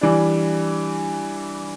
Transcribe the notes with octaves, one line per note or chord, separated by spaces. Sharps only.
E3 G3 D4